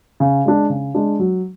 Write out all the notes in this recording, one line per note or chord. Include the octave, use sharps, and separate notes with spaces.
C#3
G#3 D4
C#3
G#3 D4
F#3